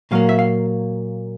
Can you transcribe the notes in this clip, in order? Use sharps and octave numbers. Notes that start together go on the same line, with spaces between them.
A#2 F#3 A#3 F5
E5
F5